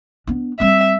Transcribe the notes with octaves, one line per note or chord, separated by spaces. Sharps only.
B3 D4
G3 C4 E5